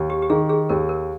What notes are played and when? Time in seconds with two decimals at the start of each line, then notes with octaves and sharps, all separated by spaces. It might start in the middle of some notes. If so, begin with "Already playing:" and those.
Already playing: D#2
0.10 G4
0.22 G4
0.30 D#3 G#4
0.49 G#4
0.69 D#2 A#4
0.89 A#4